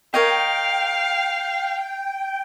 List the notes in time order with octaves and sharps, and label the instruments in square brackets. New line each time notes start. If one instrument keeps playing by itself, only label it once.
[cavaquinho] A#4 C#5 D#5 [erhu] F5 [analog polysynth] G5